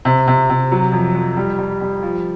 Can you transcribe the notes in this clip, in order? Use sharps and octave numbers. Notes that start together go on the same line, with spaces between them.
C3
C3
C3
F#3
F2
F2
G3
G3
G3
F3